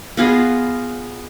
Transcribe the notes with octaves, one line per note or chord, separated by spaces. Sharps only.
B3 F4 G#4 D#5